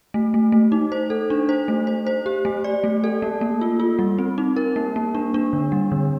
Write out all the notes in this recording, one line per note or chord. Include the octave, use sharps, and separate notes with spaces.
A3
A3
A3
D#4
C5
A4
D4
C5
A3
C5
C5
G4
A3
D5
A3
A4
A#3
A#3
F4
F4
G3
C4
D#4
A#4
A#3
A#3
D4
D4
D3
G3
D3